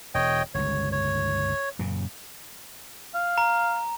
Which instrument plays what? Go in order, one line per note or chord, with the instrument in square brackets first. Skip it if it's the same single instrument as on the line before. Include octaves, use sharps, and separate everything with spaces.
[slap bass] E1 [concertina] C#5 D#5 G5
[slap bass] G1 C#2 [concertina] C#5
[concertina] C#5
[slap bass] F#2 A#2 C#3
[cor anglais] F5
[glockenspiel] A#5